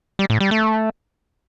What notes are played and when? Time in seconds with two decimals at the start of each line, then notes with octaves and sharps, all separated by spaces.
0.19 G3
0.30 A2
0.40 G3
0.51 A3